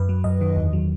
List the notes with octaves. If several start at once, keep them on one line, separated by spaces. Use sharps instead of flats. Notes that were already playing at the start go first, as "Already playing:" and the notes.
Already playing: F#2 B4
F#3
F#2 D#5
D#3
E2
F#3